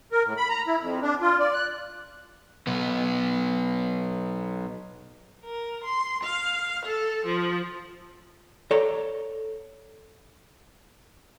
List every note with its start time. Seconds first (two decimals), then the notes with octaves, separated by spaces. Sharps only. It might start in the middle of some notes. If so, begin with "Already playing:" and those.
0.12 A#4
0.24 A2
0.37 B5
0.49 A#5
0.67 E4
0.80 F2
1.02 D4
1.21 F4
1.40 D5
1.54 F#6
2.67 B1 B3
5.44 A#4
5.84 C6
6.23 F5
6.85 A4
7.26 F3
8.71 A4 C#5 D5 A#5